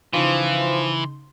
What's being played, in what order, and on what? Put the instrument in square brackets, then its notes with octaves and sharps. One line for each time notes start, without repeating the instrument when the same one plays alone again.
[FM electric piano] C#3 D#4 C6 [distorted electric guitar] E3 [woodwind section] F3